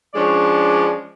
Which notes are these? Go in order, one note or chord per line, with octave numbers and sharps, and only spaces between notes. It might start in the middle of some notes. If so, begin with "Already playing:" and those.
F3 G#3 C#4 D4 D5